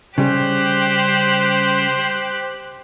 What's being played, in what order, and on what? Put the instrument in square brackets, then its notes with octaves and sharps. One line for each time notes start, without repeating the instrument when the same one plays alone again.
[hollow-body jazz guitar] C#3 G3 [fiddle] G4 F#6 [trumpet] C5